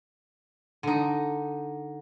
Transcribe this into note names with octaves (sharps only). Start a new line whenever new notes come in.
D3 D#4